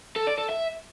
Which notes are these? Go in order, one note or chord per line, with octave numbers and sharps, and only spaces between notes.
A4
D5
A4
E5